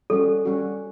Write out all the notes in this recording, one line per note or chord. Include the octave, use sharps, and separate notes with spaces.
G3 C#4 F#4 A4
G3 C#4 F#4